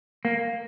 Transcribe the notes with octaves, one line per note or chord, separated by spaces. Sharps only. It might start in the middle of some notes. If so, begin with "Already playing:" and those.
A#3